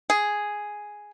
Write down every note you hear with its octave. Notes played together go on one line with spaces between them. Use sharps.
G#4